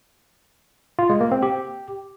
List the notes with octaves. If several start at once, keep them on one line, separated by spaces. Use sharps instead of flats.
F4
G#3
A#3
C4
G4